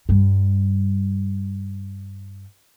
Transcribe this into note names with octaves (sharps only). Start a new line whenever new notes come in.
G2 G3